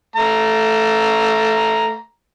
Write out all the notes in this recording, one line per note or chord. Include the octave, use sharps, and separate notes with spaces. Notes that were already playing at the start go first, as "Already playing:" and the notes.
A3 A#5